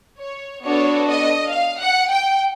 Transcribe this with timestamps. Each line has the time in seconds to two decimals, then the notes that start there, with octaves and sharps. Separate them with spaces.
0.20 C#5
0.63 B3 D4 F#4 A4 C#5
1.08 D#5
1.52 F5
1.81 F#5
2.12 G5